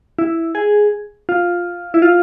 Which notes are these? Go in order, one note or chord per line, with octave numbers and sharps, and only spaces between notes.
E4
G#4
F4
E4
F4